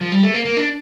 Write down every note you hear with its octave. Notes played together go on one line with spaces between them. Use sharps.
F3
G3
A3
A#3
A#3
D4